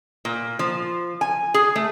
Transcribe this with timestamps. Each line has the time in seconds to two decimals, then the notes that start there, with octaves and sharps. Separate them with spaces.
0.25 A#2
0.59 F3
1.21 G#5
1.54 G#4
1.76 A3